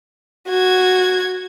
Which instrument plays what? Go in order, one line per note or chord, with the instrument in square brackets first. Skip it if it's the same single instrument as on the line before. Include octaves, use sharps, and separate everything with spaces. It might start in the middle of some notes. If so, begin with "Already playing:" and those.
[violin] F#4 G#6